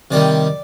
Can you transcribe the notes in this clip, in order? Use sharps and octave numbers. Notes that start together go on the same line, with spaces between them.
C3 D#3 G3 D5